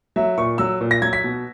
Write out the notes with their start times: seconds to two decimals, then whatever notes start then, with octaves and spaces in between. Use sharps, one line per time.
0.16 F#3 E5
0.38 A#2 C#6
0.58 F#3 E6
0.81 A#2
0.91 A#6
1.02 F#3 G#6
1.13 B6
1.24 B2